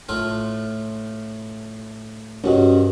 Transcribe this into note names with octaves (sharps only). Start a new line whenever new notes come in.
A2 A3 F4
C2 G2 C#4 F#4 D#5